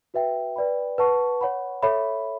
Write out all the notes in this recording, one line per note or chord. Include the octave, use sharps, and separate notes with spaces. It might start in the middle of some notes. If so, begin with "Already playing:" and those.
F#4 B4 E5 G5
B4 D5 G5 B5
B4 F#5 A5 C#6
C#5 F#5 B5
A4 C#5 E5 B5